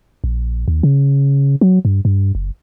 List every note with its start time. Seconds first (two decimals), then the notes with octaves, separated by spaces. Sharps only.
0.24 A#1
0.68 D#2
0.83 C#3
1.61 F#3
1.85 G2
2.05 G2
2.35 F#1